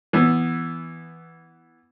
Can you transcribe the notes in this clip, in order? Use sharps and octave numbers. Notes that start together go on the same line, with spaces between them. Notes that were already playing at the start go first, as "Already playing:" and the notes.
E3 B3